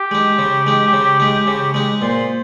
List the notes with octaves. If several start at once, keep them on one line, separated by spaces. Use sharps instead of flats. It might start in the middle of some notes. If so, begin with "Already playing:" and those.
Already playing: G4
G#3 D#4
C#3
G#3 D#4
C#3
G#3 D#4
C#3
G#3 D#4
A#2 C5